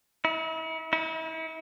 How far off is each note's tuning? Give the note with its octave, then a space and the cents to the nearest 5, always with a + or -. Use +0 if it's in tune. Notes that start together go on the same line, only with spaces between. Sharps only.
E4 -40
E4 -40